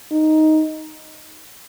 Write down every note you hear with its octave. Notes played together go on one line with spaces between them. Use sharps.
D#4